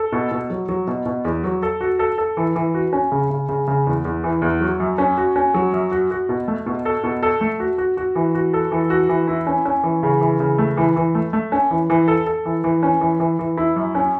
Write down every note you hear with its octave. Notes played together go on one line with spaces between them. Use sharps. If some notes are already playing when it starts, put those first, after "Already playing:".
Already playing: A4
B2
B2
F#3
F#3
B2
B2
E2
F#3
A4
F#4
A4
A4
E3
E3
F#4
C#4
C#3
C#3
C#3
C#3
E2
E2
E3
E2
F#3
F#2
C#4
F#4
C#4
F#3
F#2
F#4
F#4
B2
A3
B2
A4
B2
A4
A3
F#4
F#4
F#4
E3
F#4
A4
E3
F#4
E3
E4
C#4
C#4
E3
C#3
E3
C#3
A3
E3
E3
A3
A3
C#4
E3
E3
A4
A4
E3
E3
C#4
E3
E3
E3
E4
F#2
C#4